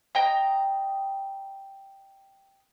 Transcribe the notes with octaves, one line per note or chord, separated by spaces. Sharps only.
D#5 G5 A#5